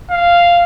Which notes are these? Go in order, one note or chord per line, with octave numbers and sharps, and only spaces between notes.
F5